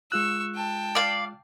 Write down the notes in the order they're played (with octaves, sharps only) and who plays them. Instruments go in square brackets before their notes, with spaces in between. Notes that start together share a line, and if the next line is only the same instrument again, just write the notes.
[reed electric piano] G#3 F4 F#6 [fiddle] C#6 E6
[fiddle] G5 A5
[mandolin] D5 F5